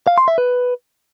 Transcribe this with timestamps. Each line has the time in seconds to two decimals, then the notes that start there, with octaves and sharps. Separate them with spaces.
0.07 F5
0.18 C6
0.28 E5
0.38 B4